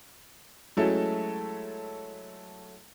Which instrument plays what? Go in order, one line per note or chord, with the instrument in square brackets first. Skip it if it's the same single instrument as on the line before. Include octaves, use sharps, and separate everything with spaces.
[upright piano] F#3 G#3 A3 C#4 E4 A4